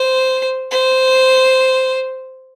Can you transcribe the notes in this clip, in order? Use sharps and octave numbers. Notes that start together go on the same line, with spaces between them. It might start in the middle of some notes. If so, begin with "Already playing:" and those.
Already playing: C5
C5